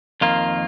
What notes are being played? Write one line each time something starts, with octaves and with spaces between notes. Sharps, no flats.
F2 D#3 A#3 F4